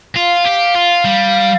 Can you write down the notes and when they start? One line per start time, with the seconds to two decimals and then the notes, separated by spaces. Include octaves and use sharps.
0.16 F4 F5
0.45 G4
0.75 F4
1.05 G3